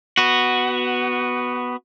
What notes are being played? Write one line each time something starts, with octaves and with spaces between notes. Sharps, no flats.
B3 F#4